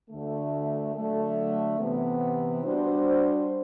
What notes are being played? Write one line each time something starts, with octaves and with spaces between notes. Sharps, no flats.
D2 D3 A3
D3 F#3 A3
C3 E3 B3
G3 D4 F#4 C5